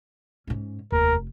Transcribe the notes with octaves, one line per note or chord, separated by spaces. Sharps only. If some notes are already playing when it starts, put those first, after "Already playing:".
G#2 C#4
F1 D#2 A#4